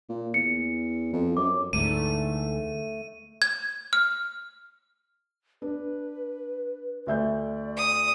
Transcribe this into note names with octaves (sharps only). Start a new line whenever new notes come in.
A#2
E2 C#7
F2
F#2 D6
D2 G#2 D3 E3 A3 D#7
G#6
F6
D4 B4
D2 D5 E5 G6
D#6